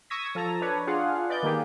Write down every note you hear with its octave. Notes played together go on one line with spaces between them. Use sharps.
C#6 D#6 E6 G#6 A#6 B6
F3 A4 A5 A#5
D4 B4 C#5
D4 F4 G#4 F5 F#5
B4 D5 D#5 G6
D#3 A#3 D#4 G4 G#4